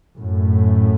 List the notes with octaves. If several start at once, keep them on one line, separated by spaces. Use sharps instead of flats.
F#2 A2